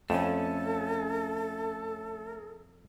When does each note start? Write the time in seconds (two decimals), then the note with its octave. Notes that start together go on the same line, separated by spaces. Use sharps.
0.10 F2 A3 C#4 A4